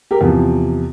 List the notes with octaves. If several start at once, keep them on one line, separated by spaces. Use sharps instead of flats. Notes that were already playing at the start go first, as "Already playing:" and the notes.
G4 A#4
E2 C3 F3